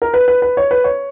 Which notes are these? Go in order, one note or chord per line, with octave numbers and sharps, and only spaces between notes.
A#4
B4
B4
B4
C#5
B4
C#5